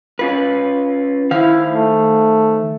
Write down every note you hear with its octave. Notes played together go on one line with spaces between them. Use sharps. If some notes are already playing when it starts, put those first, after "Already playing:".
C#4 F4 B4
D#3 E4 C5 F5
A3